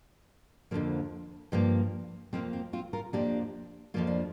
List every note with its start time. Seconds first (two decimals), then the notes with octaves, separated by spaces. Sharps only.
0.71 F2 D3 F3 A#3
1.52 G2 F3 A#3
2.33 F2 F3 A#3 C4
2.53 C4
2.73 C4 F4
2.93 F4 A#4
3.13 F2 F3 A#3 D4 G4
3.94 F2 F3 A#3 F4
4.07 D4